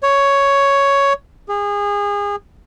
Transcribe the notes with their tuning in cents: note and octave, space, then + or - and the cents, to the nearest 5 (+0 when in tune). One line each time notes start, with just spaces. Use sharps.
C#5 +5
G#4 -30